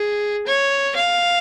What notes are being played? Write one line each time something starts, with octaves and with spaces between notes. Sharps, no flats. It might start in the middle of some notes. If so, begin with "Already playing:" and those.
Already playing: G#4
C#5
F5